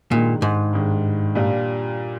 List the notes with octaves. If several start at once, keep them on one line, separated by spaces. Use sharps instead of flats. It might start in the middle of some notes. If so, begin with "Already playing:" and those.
G2 A#2 D#3 G#3
G#2
G2 D#3 G#3
A#2 G3 D4 F4